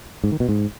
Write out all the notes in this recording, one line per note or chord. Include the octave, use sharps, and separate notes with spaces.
G#2
D#3
B2
G#2